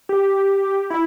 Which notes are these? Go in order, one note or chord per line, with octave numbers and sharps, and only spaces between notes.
G4
E4